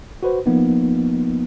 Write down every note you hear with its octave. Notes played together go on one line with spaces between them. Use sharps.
F#4 B4 C5
F3 A#3 B3 D#4